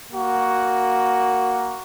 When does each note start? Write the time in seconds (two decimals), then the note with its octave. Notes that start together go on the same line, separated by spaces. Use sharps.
0.11 A#3 F#4